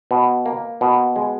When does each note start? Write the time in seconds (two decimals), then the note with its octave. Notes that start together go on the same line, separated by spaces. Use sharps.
0.11 B2
0.46 A#3
0.81 B2
1.16 G#3